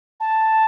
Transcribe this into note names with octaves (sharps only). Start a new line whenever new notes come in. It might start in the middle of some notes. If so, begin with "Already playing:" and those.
A5